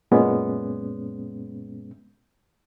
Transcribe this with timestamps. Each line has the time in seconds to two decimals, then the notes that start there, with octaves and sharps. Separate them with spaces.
0.11 F#2 A#2 G#3 B3 C#4